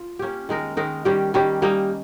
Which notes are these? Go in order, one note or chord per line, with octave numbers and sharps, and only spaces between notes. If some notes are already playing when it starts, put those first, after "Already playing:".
Already playing: F4
A#3 C#4 G4
D#3 G#3 D#4 A#4
D#3 G#3 D#4 A#4
D#3 G3 C#4 G4
D#3 G3 C#4 G4
G3 A#3 D#4